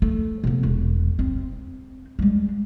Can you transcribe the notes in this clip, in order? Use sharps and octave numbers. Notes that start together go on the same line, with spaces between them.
A3
C3 B3
E1
C4
G3 G#3